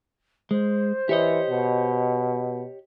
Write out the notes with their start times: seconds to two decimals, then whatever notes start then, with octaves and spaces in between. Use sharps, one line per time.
0.51 G#3 C5
1.09 E3 G4 C#5 D#5
1.50 B2